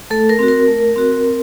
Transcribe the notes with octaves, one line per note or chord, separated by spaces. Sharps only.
A3 A4
A#4
C4 F#4
A#4
A3
C4 F#4
C4